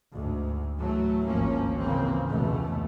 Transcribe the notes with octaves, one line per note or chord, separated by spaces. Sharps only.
D2 G#2
A2 E3 F#3 A3
G#1 D2 F3 A#3 C#4
G#2 C#3 E3 A#3 C4
F1 C#2 B2 E3 A3